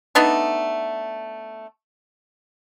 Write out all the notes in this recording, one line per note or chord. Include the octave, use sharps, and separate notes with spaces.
A3 B3 D4 D#4